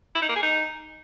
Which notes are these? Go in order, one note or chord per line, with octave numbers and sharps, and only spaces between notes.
E4
D#4
A#3
G#4
D#4